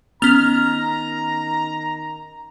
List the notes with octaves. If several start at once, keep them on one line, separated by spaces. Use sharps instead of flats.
D#3 B3 C#4 A#5 F6